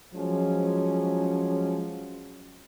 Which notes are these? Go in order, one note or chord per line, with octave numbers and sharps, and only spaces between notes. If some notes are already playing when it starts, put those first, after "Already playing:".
F3 F#3 G#3 C#4